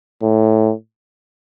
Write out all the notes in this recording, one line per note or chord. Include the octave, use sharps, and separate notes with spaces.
A2